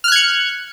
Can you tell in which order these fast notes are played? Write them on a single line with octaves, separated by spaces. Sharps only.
F6 F#6 G#6 C#7